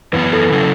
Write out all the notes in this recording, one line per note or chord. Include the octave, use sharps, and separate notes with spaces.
F#2 E3 B3 B4
A4
C#3 F#3 C#4 E4